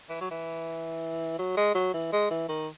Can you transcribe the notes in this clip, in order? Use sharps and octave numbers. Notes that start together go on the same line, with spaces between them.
E3
F#3
E3
F#3
G#3
F#3
E3
G#3
E3
D#3